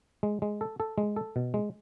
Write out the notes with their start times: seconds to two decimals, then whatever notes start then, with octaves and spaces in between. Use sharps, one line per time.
0.23 G#3
0.42 G#3
0.61 A4
0.80 A4
0.98 G#3
1.16 A4
1.36 B2
1.54 G#3